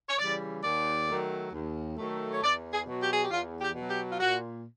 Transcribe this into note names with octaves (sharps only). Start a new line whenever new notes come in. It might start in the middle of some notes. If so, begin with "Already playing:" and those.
C#5
C#3 E3 G3 D5
D#2 D5
D#3 F#3 A3
D#2
D#3 F#3 A3
C#5
E2 D5
G#4
B2 F#3
G4
G#4
G4
E2 F4
G4
B2 F#3
G4
F4
A#2 F#4